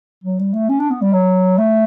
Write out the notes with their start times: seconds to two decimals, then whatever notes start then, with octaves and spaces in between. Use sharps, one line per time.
0.24 F#3
0.39 G3
0.53 A3
0.69 C#4
0.80 D4
0.90 B3
1.02 G3
1.13 F#3
1.58 A3